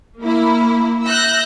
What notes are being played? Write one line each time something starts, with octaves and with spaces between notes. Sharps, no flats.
A#3 E4
E5 E6 F#6 G6 A#6